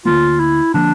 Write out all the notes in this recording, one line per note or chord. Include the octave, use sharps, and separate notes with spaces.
D2 D3 F3 A#3 F4
E4
D3 F3 A#3 D4